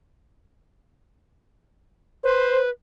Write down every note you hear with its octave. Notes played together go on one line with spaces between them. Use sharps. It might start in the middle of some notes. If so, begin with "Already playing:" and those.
B4 C5